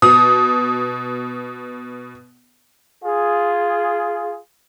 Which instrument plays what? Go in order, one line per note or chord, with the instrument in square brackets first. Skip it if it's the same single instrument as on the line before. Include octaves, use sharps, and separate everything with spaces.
[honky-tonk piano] B2 D#6
[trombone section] F4 G#4